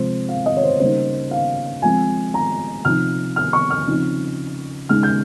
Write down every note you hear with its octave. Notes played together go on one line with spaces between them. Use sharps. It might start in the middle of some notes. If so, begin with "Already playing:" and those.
Already playing: C3 F3 G#3 C5
F5
D#5
C#5
C5
C#3 G3 A#3 D#4 C5
F5
F3 G#3 C4 G#5
A#5
C3 F3 C4 D#4 F6
F6
C#6
F6
C#3 F3 C4 D#4
C#3 G#3 D#4 F6
G6